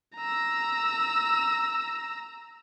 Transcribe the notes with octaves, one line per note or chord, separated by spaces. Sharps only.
A#5 E6